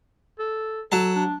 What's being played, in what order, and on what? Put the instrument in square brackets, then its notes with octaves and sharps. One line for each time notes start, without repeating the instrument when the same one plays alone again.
[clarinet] A4
[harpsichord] F#3 A5 [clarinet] A4
[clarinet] D4